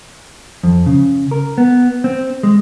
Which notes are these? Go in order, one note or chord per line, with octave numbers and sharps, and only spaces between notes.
F2
C#3
A#4
B3
C4
G#3